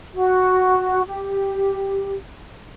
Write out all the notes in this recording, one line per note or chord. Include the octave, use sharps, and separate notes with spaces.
F#4
G4